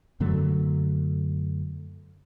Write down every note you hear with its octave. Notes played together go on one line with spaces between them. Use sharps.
F#2 D3 F#3 A3